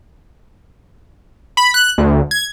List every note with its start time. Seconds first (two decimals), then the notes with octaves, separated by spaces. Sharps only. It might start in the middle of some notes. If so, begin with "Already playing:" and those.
1.57 B5
1.74 F#6
1.98 D2
2.31 G#6